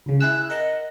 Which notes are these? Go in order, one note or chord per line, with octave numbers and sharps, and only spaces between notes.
C#2 C#3
E4 G#4 E6 F#6
A#4 D#5 F#5